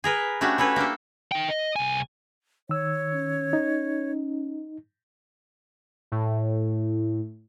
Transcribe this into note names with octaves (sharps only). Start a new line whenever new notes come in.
G#4 A#4 B4
A3 C#4 D4 F#4 G4
C#4 E4 A4 B4
A#3 D4 G4 A4
D#4 G5
D#5
C2 G#5
D#3 C#5 E6
C#4
D#4
A2